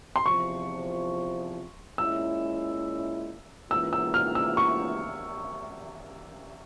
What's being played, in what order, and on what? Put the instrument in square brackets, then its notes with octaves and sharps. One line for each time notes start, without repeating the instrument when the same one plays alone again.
[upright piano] C6
[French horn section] E2 C3 F3 [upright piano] C#6
[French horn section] A#2 G#3 C#4 E4 [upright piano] E6
[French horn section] G#2 E3 A#3 C#4 F4 [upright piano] E6
[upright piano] E6
F6
E6
C#6